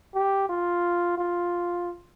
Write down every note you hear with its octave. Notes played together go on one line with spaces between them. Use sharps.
G4
F4
F4